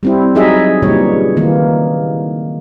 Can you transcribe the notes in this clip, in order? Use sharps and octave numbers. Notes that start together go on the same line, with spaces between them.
G3 C4 E4
F#3 D#4 G#4 D#5 E5
A#2 C#3 E3 G3 D#4 C#5
D#3 E3 A#3